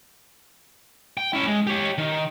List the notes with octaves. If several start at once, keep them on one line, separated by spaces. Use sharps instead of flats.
G5
C#4 E4
G#3
G4 C#5
D#3